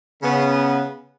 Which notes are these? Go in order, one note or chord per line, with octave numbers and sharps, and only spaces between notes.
C#3 B3